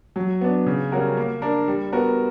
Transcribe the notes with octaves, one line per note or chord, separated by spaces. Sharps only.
F#3
B3 D4
C#3
G3 C#4 F#4 A#4
A#3
D4 A#4
G3
B3 F#4 A#4